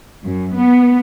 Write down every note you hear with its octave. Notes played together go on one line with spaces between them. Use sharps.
F#2
B3